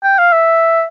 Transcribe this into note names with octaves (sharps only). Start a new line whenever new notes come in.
G5
F5
E5